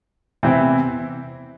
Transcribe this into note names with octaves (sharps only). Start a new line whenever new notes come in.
E2 C3 E3 C4 E4